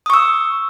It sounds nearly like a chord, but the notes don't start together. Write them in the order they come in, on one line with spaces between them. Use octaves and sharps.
D#6 C#6 E6